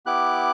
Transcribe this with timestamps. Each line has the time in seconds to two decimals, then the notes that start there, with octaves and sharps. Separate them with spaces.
0.06 B3 E4 G4 D6 F#6